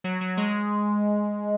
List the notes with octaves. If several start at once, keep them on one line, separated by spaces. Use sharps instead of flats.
F#3
F#3
G#3